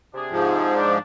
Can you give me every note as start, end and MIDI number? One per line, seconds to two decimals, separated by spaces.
0.14 0.71 48
0.14 0.71 62
0.14 0.71 68
0.30 0.98 44
0.30 0.98 53
0.76 0.98 62